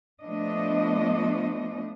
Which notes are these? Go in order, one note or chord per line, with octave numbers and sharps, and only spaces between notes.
F3 A3 B3 D4 D#5